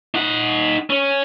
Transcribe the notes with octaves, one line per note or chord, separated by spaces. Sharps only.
D#4 F#5
C#4